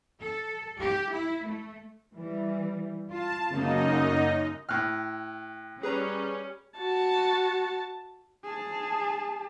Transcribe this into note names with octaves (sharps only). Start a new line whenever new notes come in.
A4
G4
E4
A3
E3 G3
F4 A5
F#2 C#3 A#3 D#4 D#5
A2 G5 F6 F#6
G3 C#4 G#4 B4 A#5
F#4 A5
G#4 A5